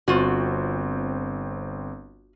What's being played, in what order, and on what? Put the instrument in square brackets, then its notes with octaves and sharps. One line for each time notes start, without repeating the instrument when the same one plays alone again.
[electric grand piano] G1 C4 [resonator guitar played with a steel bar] F4 F#4